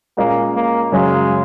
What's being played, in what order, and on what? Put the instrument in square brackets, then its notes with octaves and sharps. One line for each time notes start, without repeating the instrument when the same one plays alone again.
[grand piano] A#2 G#3 C#4 [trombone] A#3
[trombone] A#3
[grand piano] F#2 C#3 F#3 C#4 [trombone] G#3